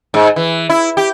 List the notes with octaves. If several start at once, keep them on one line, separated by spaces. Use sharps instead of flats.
G#2
E3
E4
G4